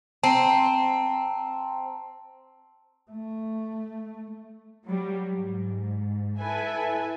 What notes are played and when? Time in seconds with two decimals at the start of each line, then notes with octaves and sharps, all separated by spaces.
0.24 C4 A5 A#5
3.12 A3
4.85 F#3 G3
5.30 G#2
6.38 E4 A4 B4 E5 G#5